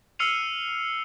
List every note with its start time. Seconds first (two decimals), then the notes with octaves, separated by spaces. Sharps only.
0.19 E6 F6 C7 C#7 D#7 F7